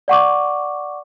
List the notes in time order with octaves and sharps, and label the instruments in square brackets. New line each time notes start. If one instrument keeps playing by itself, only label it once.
[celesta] D5 F#5 C#6 D6